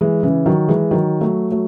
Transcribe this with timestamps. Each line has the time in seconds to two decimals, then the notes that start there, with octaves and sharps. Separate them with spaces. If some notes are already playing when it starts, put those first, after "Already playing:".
0.01 E3 G#3
0.23 C#3 E3
0.46 D#3 F#3
0.68 E3 G#3
0.91 D#3 F#3
1.21 F#3 A3
1.51 F#3 A3